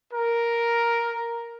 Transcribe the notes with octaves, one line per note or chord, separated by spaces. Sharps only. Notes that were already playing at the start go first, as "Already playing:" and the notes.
A#4